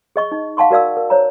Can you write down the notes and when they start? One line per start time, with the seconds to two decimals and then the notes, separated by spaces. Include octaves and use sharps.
0.16 G#4 D#5 C#6
0.32 D#4
0.57 F5 F#5 A5 C6 C#6
0.71 F#4 A#4 D5 F5 E6
0.97 A#4
1.10 C5 C#5 A#5